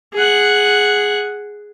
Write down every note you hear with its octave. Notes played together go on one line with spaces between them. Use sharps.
G#4 F#5